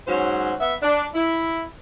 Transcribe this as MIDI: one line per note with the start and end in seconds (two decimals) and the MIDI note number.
0.07 0.53 44
0.07 0.53 54
0.07 0.53 61
0.07 0.53 66
0.07 0.53 72
0.60 0.74 59
0.60 0.74 76
0.82 1.04 62
1.14 1.63 64